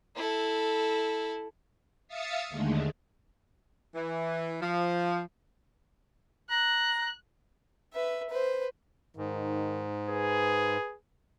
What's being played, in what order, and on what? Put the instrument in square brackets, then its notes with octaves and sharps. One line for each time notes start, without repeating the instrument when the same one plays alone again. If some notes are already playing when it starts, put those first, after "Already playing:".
[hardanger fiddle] E4 A4
[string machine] E5 F5 D#6 E6 A6 C#7
D#2 D3 G#3 A3
[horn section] E3
F3
[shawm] A#5 [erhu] F#6
[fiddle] B4 E5
B4 C5
[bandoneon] G#2 [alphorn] D#3
[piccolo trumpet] G#4 [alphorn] B4